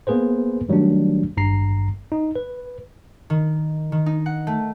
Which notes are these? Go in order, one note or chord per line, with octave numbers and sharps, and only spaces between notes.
A#3 B3 G#4 B4 C5
D#3 F#3 G3 A3 D4
G#1 G2 A#5 C7
D#4
B4
D#3
D#3
D#4
F#5
A3